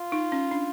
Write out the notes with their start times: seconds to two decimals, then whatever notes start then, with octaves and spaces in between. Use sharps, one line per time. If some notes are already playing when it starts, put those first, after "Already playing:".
Already playing: F4
0.12 D#4
0.32 C#4
0.51 D4